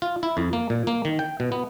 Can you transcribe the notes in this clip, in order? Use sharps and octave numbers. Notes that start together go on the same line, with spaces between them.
F4
E4
F2
A#3
A#2
A#3
D#3
G5
B2
B3